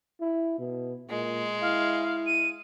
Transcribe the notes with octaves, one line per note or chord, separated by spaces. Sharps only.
E4
B2
A#2 G#3
E4 F5
D#7